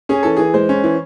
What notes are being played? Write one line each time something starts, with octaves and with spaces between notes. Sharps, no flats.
C#4 G#4
E3 A4
E3 G#4
G#3 C5
C#4
E3